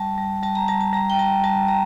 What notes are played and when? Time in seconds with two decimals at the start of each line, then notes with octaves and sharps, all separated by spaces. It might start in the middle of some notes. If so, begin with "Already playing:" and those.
Already playing: G3 A5
0.18 G3
0.43 G3 A5
0.55 A#5
0.68 G3 A5
0.81 A5
0.93 G3 A#5
1.10 G5
1.19 G3 A5
1.44 G3 A5
1.68 G3 A#5